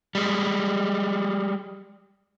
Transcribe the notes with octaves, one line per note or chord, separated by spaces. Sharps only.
G3 G#3